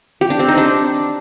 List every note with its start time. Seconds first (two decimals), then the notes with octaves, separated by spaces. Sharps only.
0.21 G4
0.30 D4
0.39 C4
0.48 D#4
0.58 D4